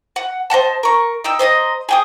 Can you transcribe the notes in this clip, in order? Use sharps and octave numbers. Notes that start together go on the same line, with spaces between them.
F#5
C5 D#5 F#5 A5
A#4 C#6
D#4 G5 E6
C5 D#5 G#5 A#5
G#4 G5 D#6